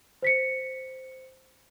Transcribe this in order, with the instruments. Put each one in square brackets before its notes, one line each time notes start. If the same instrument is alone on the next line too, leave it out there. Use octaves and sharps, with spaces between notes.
[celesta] C5 B6 C#7